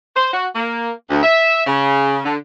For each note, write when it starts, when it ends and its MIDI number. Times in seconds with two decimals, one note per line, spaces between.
0.16 0.31 72
0.33 0.48 66
0.55 0.90 58
1.10 1.22 38
1.23 1.62 76
1.67 2.19 49
2.25 2.36 50